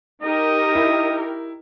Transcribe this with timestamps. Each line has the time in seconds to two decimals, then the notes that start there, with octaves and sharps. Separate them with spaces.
0.23 D#4 G4 A#4 D#5
0.75 E4